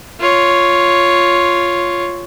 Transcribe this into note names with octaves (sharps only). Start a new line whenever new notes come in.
F4 C#5